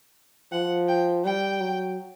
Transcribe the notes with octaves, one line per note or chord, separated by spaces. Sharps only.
F3 F#5
G5
G3 G5
F#3